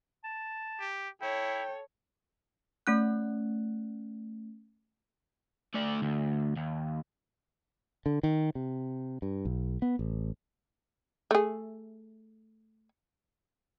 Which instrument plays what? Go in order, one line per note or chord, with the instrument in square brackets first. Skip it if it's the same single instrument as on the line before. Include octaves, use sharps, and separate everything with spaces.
[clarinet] A5
[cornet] G4
[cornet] E4 [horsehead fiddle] A4 C#5 [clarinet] G5
[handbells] A3 C#4 F#6
[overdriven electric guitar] A3 D5
D2
D#2
[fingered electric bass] D3
D#3
C3
G2
B1
B3
A1
[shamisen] A3 G#4